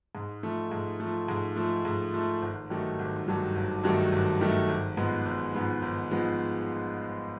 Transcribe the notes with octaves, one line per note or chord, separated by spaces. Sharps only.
G#2
F3 A3
G#2
F3 A3
G#2
F3 A3
G#2
F3 A3
G#1
G2 D#3 F#3 A3
G#1
G2 D#3 F#3 A3
G#1
G2 D#3 F#3 A3
G#1
G2 D#3 F#3 A3
G#1
G#2 F3 G#3 B3
G#1
G#2 F3 G#3 B3
G#1
F3 G#3 B3